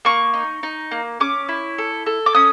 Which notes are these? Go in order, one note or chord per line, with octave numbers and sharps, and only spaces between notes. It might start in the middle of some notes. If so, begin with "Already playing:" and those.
A#3 C#6
D#4
D#4
A#3
C#4 D6
E4
A4
A4
D6
C#4 D#6